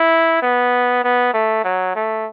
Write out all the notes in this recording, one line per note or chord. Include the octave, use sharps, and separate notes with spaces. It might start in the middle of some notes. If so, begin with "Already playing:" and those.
Already playing: E4
B3
B3
A3
F#3
A3